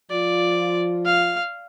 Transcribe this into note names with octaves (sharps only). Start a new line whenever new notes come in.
F3 F4 D5
F5